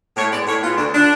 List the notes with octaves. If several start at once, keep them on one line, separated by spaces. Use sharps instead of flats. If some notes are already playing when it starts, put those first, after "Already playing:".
A2 C#5
G#3 B3 D5
A2 C#5
G#3 B3 F4
D2 D4
D3 F3 D4